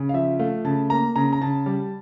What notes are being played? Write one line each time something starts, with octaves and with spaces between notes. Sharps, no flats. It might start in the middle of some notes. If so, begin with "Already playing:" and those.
Already playing: C#3
F5
F3 E5
A3 F5
C#3 A5
A#3 A#5
C#3 A#5
A#5
C#3 A5
G3